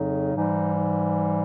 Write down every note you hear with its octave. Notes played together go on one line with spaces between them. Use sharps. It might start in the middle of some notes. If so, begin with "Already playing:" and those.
Already playing: F2 C#3 F#3 D#4
G#2 E3 G3 D#4